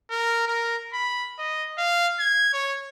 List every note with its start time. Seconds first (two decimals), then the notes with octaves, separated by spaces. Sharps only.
0.11 A#4
0.48 A#4
0.93 B5
1.39 D#5
1.78 F5
2.20 G#6
2.53 C#5